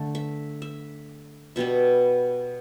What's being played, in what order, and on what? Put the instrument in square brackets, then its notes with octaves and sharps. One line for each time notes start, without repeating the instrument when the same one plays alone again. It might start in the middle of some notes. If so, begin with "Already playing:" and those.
Already playing: [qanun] D3 A3
E5
E5
B2 G3 B3 E5